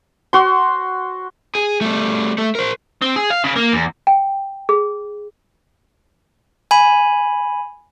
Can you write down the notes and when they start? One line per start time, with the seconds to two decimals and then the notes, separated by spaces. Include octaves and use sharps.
0.33 F#4 C6
1.55 G#4
1.81 G3 A3
2.38 A3
2.55 A#4 C5
3.02 C4
3.16 G#4
3.30 F5
3.44 C#3
3.56 A#3
3.73 E2
4.07 G5
4.69 G#4
6.71 G#5 B5